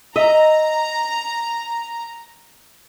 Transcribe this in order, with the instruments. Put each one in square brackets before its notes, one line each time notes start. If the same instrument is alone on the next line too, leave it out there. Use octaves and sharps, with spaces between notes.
[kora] D#5 E5 [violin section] A#5